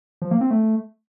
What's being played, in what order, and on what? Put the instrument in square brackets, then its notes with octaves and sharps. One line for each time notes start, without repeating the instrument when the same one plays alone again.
[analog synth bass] F3
A#3
C4
A3